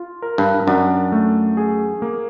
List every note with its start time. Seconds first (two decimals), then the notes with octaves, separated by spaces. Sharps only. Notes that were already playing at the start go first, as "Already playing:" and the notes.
Already playing: F4
0.22 A#4
0.38 G2
0.67 F#2 D4
1.12 A3
1.57 G#4
2.02 A#3